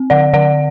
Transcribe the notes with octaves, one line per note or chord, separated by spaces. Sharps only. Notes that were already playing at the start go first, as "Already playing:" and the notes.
Already playing: C4
D3 D5 F#5
D3 D5 F#5